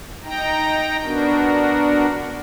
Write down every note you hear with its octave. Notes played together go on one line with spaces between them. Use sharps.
D#4 G5 A#5
B3 D4 F#4 A#4